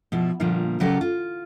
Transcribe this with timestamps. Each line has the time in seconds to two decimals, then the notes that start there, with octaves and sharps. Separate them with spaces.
0.12 B2 F3 E4
0.40 A#2 D3 F3 G3 A#3
0.80 C#3 F#3 F#4 G4 A4 A#4
1.01 F4